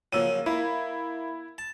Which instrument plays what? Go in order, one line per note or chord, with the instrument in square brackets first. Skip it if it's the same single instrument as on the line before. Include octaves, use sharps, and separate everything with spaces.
[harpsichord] C#3 F3 F#3 [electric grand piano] A#3 E6 D#7
[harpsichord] A#3 [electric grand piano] E4
[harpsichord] A5